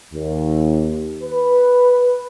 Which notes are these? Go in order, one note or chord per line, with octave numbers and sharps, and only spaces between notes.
D#2
B4